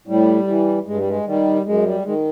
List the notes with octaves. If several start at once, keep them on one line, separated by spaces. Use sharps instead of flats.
A2 G3
E3
G2 G#3
G3
G#3
D#3 G3
F#2 G#3
G3
D#3 G#3